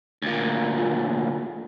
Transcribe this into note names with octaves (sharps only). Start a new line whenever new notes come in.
D2 A#2